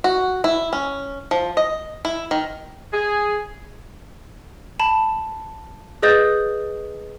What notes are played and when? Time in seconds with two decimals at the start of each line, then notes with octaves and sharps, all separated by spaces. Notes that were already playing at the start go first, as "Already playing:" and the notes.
0.04 F#4
0.44 E4
0.73 C#4
1.31 F3
1.57 D#5
2.05 E4
2.31 D#3
2.93 G#4
4.80 A5 B5
6.03 G#4 B4 D#5 D#6 G6 A6